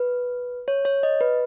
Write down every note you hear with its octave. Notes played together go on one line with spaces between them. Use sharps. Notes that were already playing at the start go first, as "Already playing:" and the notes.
Already playing: B4
C#5
C#5
D#5
B4